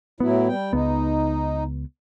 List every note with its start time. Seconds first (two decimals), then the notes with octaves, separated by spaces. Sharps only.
0.20 A2 F#3 B3 E4
0.48 G3 G5
0.73 C#2 B3 D#4